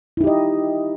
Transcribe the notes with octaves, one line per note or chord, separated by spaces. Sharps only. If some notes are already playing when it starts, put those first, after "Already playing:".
D#4 E4 G4 D#5